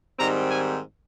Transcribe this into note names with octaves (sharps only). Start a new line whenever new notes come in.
G#2 D#3 G3 C4 A#5
G#5